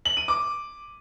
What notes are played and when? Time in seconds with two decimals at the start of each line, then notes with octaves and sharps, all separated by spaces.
0.05 F#7
0.17 D#7
0.28 D6